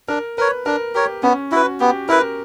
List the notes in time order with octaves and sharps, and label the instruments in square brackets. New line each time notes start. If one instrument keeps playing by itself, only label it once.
[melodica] D4 [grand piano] A#4
[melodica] A#4 C#5 [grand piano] B4
[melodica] D4 [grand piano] A#4
[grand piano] G4 [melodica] A#4 C#5
[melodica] B3 [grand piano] C#4
[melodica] E4 B4 [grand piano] F#4
[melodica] B3 [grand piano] G4
[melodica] E4 B4 [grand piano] A#4